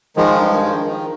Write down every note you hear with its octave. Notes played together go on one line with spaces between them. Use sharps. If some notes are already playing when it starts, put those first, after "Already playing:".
D#3 F3 G#3
G2
D#3
D#3